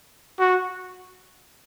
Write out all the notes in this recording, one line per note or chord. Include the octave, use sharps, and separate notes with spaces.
F#4